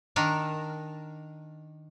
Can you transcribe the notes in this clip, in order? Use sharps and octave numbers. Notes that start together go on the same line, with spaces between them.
D#3 D4 A#4